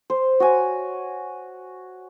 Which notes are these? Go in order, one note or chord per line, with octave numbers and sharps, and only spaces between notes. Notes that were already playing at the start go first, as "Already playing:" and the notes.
C5
F#4 C#5 G#5